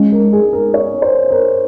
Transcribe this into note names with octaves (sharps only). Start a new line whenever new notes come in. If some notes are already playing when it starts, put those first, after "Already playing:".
Already playing: G#3 C#4
A#4
G#4
A#4
C#5
C5
A#4